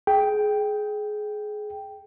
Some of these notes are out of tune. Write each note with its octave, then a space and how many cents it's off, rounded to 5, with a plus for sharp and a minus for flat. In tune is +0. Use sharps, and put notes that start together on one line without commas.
G#4 +20 G5 +0